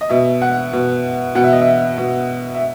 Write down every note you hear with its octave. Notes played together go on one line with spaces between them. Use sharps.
D#5
B2 E5
F#5
B2
B2 F#5
E5
D#5
E5
B2
E5